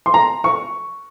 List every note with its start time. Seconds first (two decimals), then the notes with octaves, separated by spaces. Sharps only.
0.06 C6
0.14 A#5
0.44 C#6